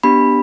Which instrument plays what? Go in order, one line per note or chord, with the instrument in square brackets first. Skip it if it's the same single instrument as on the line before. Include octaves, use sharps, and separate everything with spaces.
[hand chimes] B3 D4 G4 B5